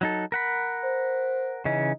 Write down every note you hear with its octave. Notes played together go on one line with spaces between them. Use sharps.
F#3 D#4 A4
A#4 F#5 B5
C5
C#3 E3 C#4 D#4